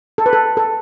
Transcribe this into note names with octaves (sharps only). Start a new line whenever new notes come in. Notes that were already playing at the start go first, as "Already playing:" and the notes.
A4
B4
A4
A4